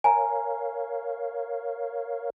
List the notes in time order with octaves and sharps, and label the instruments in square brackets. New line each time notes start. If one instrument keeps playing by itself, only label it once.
[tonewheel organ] A#4 C#5 F5 [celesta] G#5 A#5